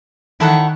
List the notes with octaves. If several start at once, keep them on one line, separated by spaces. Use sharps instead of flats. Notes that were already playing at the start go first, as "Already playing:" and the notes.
D#3 E4 A4 C#5 F#5